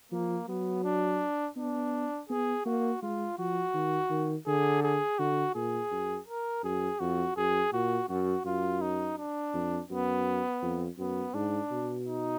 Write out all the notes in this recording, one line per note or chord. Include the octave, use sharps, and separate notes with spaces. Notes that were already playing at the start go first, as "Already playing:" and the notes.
F3 A#3
F#3 B3
D4
B3 D4
B3 G#4
A#3 F#4
G#3 F4
F3 F#4
D#3
D#3
D3 G#4
G#4
D3 F#4
A#2 G#4
F#2
A#4
F#2 G#4
F2 F#4
F#2 G#4
A#2 F#4
F#2 F#4
F#2 F4
D#4
D4
F2
F#2 B3
F2
F#2 B3
G#2 D4
B2
D#4